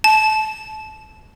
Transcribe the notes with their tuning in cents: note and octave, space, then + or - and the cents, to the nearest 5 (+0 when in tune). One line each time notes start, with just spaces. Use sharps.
A5 -25